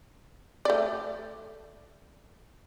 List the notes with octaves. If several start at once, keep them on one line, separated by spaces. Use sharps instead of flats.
A3 D5